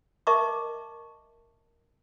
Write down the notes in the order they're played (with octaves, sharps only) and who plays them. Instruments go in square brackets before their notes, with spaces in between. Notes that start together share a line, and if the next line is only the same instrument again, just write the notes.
[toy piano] A#4 D#5 E5 A5 C#6 D6